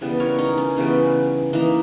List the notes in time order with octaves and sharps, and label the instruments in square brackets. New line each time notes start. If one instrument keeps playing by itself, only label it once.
[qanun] C#3 E3 G3 B3
A#4 C#5
D#4
C#4
C#3 E3 G3 B3
E3 A#3 D#4